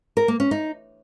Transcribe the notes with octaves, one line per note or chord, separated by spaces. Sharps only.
A#4
A#3
C#4
D#4